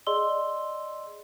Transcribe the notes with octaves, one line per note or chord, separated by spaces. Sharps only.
G#4 D5 D#5 C6 E6 G7